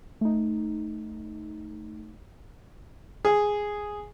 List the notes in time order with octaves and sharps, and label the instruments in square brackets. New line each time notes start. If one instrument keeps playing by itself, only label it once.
[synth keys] A3 D#4
[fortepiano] G#4